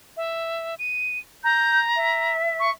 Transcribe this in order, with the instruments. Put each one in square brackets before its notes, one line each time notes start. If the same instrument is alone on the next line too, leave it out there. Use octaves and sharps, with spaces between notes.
[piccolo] E5
D#7
[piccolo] A#5 [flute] G6
[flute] E5
[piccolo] C#6